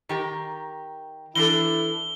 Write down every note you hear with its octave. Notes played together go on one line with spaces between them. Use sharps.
D#3 G4 A#4
E3 D4 E4 A4 G7